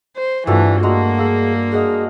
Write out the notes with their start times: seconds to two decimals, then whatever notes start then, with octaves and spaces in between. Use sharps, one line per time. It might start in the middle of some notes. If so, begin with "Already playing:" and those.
0.16 C5
0.47 G2 E3 A3 D4 F4 F#4 A4 F5
0.83 G#3 A#3 F#4 A#5
1.18 G#4 F5 E6
1.72 G#4 D#5 F#5 F6